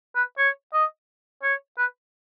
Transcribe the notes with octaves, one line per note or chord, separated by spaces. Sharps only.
B4
C#5
D#5
C#5
B4